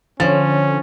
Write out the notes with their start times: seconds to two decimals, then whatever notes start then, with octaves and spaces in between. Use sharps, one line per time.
0.20 D3 F3 C#4 C#5 A6